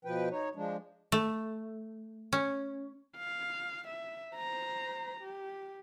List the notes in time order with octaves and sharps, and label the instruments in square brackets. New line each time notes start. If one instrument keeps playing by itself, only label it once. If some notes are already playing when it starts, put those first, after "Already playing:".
[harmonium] B2 F3 B4 G5
D#4 C#5
F3 G#3 D4
[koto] A3
C#4
[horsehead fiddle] F5
E5
C5 A#5
G4